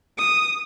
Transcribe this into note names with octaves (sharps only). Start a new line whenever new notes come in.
D#6